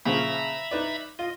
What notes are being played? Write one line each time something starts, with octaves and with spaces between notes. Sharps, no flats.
A#2 C#3 F3 E5 A#5 B5
D#4 B4 D5
F4 D#5